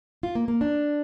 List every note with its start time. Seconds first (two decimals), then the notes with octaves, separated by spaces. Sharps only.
0.23 F4
0.35 A#3
0.48 A#3
0.61 D4